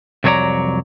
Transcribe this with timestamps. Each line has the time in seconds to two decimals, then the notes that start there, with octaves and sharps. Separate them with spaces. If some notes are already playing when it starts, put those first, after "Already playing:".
0.24 C2 F2 F#3 C#5 D5 A#5